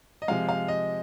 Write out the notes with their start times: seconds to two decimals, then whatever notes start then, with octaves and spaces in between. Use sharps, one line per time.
0.22 D#5
0.28 C3 F3 G#3 F5
0.49 F5
0.68 D#5